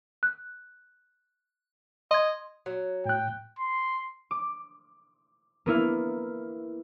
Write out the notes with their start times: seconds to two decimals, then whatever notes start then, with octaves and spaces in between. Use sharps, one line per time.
0.23 F#6
2.11 D#5 C6 G#6
2.66 F#3
3.05 A2 G5 F#6
3.59 C6
4.31 D6
5.66 A#3 B3 E4 F5